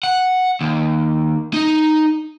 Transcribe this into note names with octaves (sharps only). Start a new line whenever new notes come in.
F#5
D#2
D#4